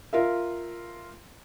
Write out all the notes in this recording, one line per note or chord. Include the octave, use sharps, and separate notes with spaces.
F4 A#4 E5